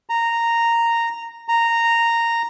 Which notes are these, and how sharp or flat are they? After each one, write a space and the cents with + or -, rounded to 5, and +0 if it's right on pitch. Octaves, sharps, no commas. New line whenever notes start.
A#5 -10
A#5 -10